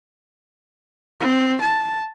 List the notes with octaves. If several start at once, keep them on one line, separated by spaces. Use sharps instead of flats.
C4
A5